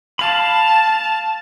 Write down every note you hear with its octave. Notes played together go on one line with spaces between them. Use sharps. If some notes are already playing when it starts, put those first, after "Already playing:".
F5 A5 B5